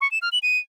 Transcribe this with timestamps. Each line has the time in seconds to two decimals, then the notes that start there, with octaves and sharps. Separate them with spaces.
0.01 C#6
0.11 E7
0.22 F6
0.32 F#7
0.43 D#7